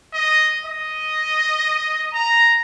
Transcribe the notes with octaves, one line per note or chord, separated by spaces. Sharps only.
D#5
D#5
A#5